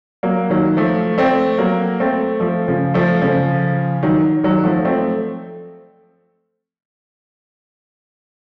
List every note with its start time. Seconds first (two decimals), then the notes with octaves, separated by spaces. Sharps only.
0.23 F#3 A#3
0.50 D#3 F#3
0.77 F3 A3
1.18 A3 C4
1.58 F#3 A#3
2.00 A3 C4
2.40 F3 A3
2.68 C#3 F3
2.94 F3 A3
3.22 C#3 F3
4.03 D#3 F#3
4.43 D#3 F#3
4.64 F3 A3
4.85 A3 C4